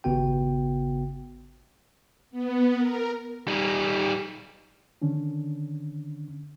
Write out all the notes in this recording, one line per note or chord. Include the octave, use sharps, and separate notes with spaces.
G#1 C#3 B3 F#4 G5
B3
A#4
G3 D#4
D3 D#3 C#4 D4